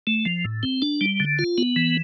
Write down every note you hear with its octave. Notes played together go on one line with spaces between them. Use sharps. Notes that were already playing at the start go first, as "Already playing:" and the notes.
A3
F3
A2
C4
D4
G3
D3
F4
B3
E3